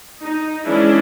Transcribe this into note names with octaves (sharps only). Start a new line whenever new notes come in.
D#4
E3 G#3 C#4 D4 E4